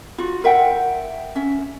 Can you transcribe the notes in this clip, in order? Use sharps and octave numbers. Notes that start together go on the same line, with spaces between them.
F4 F#4
A#4 E5 F#5 G5
C#4 E5